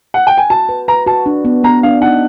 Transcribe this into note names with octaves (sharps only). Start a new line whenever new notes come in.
F#5
G5
G#5
F#4 A5
B4
B4 A#5
F#4 A5
D4
B3
B3 A#5
D4 F5
D#4 F#5